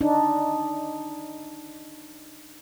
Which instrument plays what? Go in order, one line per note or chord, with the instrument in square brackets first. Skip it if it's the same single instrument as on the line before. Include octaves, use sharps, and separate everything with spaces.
[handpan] D4 D#4